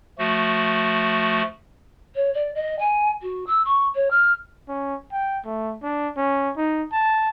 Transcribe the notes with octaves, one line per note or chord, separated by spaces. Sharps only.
F3 A3 F#4
C#5
D5
D#5
G#5
F#4
E6
C#6
C#5
F6
C#4
G5
A3
D4
C#4
D#4
A5